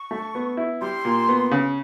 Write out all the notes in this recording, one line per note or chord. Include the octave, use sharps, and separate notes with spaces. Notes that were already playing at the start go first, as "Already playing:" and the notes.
Already playing: C#6
A3
B3
E4
G3 C6
A#2
B3
C#3